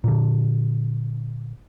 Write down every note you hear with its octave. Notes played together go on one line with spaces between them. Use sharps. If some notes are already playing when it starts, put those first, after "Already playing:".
A#2 D3